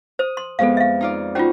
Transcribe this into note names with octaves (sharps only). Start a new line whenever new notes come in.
C5 D#6
C6
F2 G#3 B3 A4 F5
E5 F5
D#4 F4 D5
C#4 D#4 F4 F#4 C5